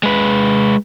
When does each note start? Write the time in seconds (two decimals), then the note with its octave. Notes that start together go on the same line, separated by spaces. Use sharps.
0.03 G#3 B4